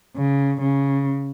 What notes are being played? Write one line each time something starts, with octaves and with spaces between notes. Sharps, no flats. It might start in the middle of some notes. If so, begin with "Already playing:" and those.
C#3
C#3